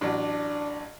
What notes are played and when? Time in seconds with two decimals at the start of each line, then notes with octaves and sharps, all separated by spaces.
0.01 A1 F#3 D4